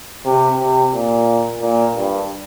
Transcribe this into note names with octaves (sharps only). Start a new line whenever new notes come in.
C3
C3
A#2
A#2
G2